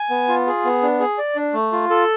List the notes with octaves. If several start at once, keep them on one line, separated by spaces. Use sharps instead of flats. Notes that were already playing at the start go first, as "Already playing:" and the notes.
Already playing: G#5
B3
F4
G#4
B3
D4
G#4
D5
D4
A3
F4
A4